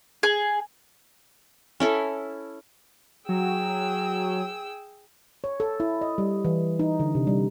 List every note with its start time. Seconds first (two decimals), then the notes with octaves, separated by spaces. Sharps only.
0.23 G#4
1.80 C#4 E4 A4
3.29 F#3 G#4 G5 E6
5.44 C#5
5.60 A4
5.80 E4
6.01 D#5
6.18 G3
6.45 E3
6.79 D#4
7.00 D3
7.15 C3
7.27 G3